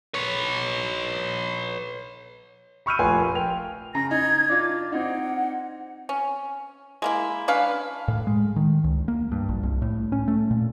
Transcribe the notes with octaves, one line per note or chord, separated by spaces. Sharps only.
B4 C#5
B5 C#6 E6 F6 G6 D#7
F1 A#1 F4 B4 G#5 B5
A#4
G5 F7
C#3 A#5 A#6
D#4 G#6
D4 F4 D6
C4 D#4 F#5
C#4
G#3 A#3 E4
C#4 D4 B4 F5
A2
G#3
D#3
C#2
A#3
G2
A#1
C2
A2
C#4
A3
A#2